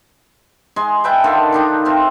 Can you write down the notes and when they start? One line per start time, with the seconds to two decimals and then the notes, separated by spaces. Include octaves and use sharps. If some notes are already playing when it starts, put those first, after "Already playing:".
0.76 G#3 D#5 G#5 C6
1.04 B4 E5 G5 A5
1.24 D3 D#3 F4 A4
1.52 D#3 D4 D#4
1.85 C4 F4 E5